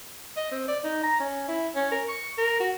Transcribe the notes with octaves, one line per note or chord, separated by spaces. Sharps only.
D#5
C4
D5
D#4
A#5
C#4
E4
C#4
A#4
C#6
A#4
F#4